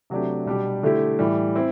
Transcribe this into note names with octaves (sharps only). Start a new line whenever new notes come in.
C3 F#3 A3 D4 G4
B2 G3 D4 G4
D3 A3 E4 G4
A2 E3 G3
C4 E4